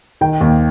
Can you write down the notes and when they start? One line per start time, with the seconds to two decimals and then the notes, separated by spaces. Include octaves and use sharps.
0.21 D#3 G5
0.41 D#2